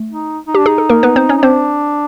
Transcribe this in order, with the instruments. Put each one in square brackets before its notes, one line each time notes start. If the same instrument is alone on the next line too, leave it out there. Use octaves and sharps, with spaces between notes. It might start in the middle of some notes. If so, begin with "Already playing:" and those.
Already playing: [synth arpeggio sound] A3
[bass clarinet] D#4
D#4
[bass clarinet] D4 [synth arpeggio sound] G4
[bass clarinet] D#4 [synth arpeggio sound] G#4
[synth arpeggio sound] A4
A#3 A#4
B3 B4
C4 C5
C#4 C#5
[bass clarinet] D#4
[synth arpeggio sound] C4 C5 [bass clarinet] D4